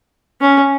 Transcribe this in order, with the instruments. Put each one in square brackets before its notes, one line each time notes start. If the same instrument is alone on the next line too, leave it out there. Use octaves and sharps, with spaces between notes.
[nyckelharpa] C#4